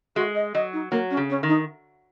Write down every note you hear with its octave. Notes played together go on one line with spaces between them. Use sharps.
G#3 F#4
D#5
F#3 D#5
D#4
F#3 A#3
C#4
C#3
C#4
D#3
D#4